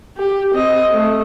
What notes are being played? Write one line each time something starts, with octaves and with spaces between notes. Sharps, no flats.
G4
C4 D#5
A3